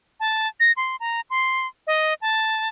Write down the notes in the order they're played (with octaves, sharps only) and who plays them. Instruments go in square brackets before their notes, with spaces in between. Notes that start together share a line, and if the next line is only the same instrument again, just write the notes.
[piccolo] A5
A#6
C6
A#5
C6
D#5
A5